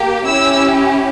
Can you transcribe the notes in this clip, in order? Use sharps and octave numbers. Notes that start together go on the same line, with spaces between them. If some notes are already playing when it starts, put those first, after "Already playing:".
Already playing: A#3 G4
C#4 E4 G4 E6